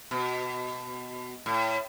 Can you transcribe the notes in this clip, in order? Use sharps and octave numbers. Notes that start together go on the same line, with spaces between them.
B2
A2